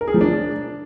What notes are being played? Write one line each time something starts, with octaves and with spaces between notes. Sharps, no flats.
A#4
G#4
F3
D4